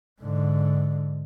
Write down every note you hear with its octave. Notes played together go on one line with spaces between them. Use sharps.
G#2 D3